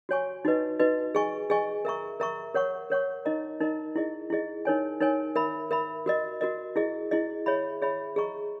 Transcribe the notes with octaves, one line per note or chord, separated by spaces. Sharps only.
F#4 C#5 G#5 C#6
D#4 F#4 B4 D#5
D#4 F#4 B4 D#5
G#4 D#5 G#5 C#6
G#4 D#5 G#5 C#6
A#4 E5 A#5 C#6
A#4 E5 A#5 C#6
A#4 C#5 F#5 C#6
A#4 C#5 F#5 C#6
D#4 A#4 D#5 A#5
D#4 A#4 D#5 A#5
E4 G#4 D#5
E4 G#4 D#5
D#4 A#4 C#5 G#5
D#4 A#4 C#5 G#5
A#4 E5 B5
A#4 E5 B5
F#4 A#4 D#5
F#4 A#4 D#5
E4 G#4 D#5
E4 G#4 D#5
G#4 C#5 E5 B5
G#4 C#5 E5 B5
G#4 D#5 A#5 C#6